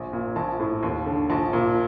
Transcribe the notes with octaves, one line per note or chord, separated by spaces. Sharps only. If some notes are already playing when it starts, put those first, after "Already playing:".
Already playing: A#1
A#2
A#1 A5
A2
D#2
D3
A#1 A5
A#2